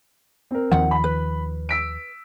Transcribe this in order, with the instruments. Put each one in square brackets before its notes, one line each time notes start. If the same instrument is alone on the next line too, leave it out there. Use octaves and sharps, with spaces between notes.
[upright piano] C4 A#4
[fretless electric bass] D#2 D#3 F3 [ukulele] F#5
[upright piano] B5
[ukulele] B4
[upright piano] E6 B6 D7